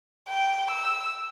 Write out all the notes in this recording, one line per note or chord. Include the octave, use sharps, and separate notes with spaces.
G5
E6